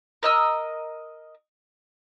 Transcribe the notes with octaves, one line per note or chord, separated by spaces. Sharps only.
A#4 D#5 E6